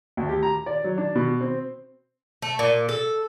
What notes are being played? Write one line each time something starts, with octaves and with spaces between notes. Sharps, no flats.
D2
G4
A#5
D5
F#3
D4
B2
C4
A3
A#2
A4